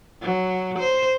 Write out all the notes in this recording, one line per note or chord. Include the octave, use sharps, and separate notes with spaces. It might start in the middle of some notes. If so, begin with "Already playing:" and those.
F#3
C5